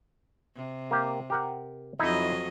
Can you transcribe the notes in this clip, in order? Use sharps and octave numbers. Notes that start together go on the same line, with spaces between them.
C3
A#3 G4
G4 A#4 F#5
F2 F#3 D#4 E4 D#5